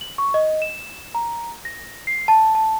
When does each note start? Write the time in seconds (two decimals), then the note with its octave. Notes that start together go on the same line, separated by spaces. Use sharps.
0.01 F#7
0.18 C#6
0.34 D#5
0.62 E7
1.15 A#5
1.65 A#6
2.07 C7
2.28 A5
2.55 A5